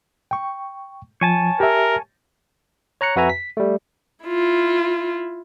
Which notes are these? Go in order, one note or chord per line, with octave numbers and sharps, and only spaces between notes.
G5 C#6
F3 C#5 G#5 A5
G4 A#4 E5
C#5 A#5 F#6 C#7
F2 F#4 B4 E5 G#5 A#5
B6
G3 A3
E4 F4